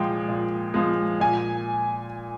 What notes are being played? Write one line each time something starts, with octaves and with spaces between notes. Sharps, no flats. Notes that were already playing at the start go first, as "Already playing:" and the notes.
Already playing: A#2 F3 G#3 G5
A#2
F3 G#3
A#2 G#5